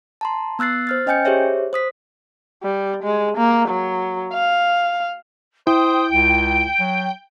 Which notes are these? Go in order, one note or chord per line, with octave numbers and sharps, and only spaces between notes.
A5 A#5 C6
B3 E6 F#6 A6 C7
C5 F6 A6
C#4 D#5 G5 G#5 G6 C#7
G4 G#4 C5 C#5 E5
C5 D#6 B6
G3
G#3
A#3
F#3
F5
E4 C5 G5 D#6
C#2 D7
F#3